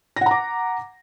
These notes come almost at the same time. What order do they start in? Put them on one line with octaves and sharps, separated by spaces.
A#6 F#5 A#5 D6